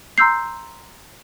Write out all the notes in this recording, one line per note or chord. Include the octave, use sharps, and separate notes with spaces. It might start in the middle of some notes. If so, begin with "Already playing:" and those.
A#5 C6 E6 G6 C7